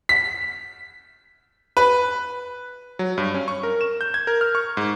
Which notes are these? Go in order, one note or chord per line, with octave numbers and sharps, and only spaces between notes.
B6
B4
F#3
G2
C#4
C#6
A#4
E7
G6
G#6
A#4
F6
C#6
G#2